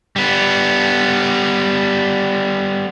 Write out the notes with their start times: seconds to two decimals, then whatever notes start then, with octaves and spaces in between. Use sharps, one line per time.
0.16 G3 B3